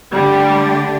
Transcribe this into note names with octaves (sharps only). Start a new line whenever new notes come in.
D3 G3 A3 D4 G4 D5